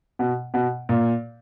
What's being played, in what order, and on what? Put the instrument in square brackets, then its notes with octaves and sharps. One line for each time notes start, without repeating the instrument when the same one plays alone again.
[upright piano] B2
B2
A#2